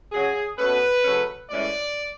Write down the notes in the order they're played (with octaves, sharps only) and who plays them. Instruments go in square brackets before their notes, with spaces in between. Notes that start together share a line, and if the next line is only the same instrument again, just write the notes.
[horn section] C#3 F#3 C#4 G#4
B2 A3 C#4 B4
C#3 F#3 A3 C#4
A2 E3 G#3 C#4 D5